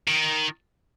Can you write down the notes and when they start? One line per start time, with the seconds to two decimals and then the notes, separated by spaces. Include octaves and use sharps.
0.08 D#3